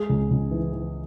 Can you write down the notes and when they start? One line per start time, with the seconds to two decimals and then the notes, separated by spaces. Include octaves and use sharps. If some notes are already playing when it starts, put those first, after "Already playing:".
Already playing: G#3 G#4
0.09 C#2
0.31 C#2
0.51 E3
0.73 E3